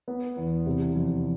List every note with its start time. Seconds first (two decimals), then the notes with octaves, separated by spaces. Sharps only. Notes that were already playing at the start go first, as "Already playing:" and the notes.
0.08 B3
0.37 E2
0.66 C3
0.95 F2